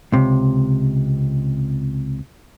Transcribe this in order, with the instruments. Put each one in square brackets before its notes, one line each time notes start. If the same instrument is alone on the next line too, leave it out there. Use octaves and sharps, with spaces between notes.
[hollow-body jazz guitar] C#2 C3